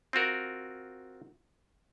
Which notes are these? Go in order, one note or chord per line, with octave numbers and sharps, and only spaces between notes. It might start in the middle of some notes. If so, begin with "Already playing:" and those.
C4 F4 F#4 A#4